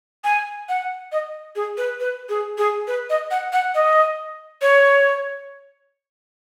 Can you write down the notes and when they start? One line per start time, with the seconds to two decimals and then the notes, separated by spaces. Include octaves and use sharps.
0.24 G#5
0.69 F#5
1.12 D#5
1.56 G#4
1.77 B4
2.00 B4
2.29 G#4
2.58 G#4
2.87 B4
3.10 D#5
3.31 F#5
3.53 F#5
3.75 D#5
4.62 C#5